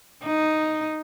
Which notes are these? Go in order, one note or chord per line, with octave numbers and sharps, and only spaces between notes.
D#4